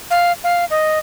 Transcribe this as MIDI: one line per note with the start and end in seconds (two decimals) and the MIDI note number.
0.11 0.32 77
0.44 0.65 77
0.70 0.99 75